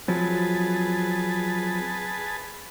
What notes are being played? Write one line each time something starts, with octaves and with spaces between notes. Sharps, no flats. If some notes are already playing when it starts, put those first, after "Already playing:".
F3 F#3 C4 G#4 B4 A5